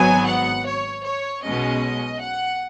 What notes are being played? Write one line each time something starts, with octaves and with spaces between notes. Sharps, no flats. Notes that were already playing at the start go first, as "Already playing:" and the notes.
Already playing: G#1 G#2 F#3 B3 G#5
F#5
C#5
C#5
B1 B2 G#3 C#4 D#5
F#5